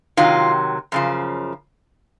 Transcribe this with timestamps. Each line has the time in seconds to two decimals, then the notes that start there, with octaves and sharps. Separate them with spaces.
0.17 C3 D#3 F#3 F4
0.92 F#2 C#3 F3